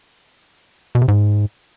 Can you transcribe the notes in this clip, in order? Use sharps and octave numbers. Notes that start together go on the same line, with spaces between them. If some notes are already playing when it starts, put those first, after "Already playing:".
B2
C3
G#2